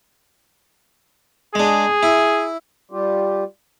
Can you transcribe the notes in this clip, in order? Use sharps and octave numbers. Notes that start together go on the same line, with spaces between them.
G#3 D4 G#4
E4
G3 F4 G4